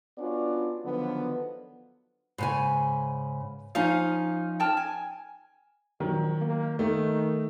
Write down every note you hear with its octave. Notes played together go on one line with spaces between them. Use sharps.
B3 C#4 D4 F4 F#4 D5
D3 D#3 F3 F#3 B3
G#2 C#3 B4 G#5
F3 C#4 D#4 F5
G5 A5 F6
G#5
A#1 D#3 F#3
A#3
D#3 A3